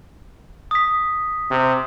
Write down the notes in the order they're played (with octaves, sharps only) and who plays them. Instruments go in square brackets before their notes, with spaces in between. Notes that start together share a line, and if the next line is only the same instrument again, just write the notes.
[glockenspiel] D#6 B6
[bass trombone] C3